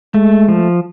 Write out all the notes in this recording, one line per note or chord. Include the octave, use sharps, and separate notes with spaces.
G#3 A3
F3